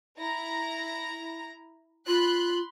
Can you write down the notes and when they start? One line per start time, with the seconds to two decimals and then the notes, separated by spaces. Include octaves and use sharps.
0.19 E4 A#5 A#6
2.07 F4 B5 C6 F#6